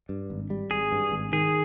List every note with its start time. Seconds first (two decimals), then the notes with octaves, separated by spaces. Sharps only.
0.09 G2
0.30 G#1
0.50 G3
0.71 G#1 G#4
0.92 G2
1.12 G#1
1.33 D#3 G#4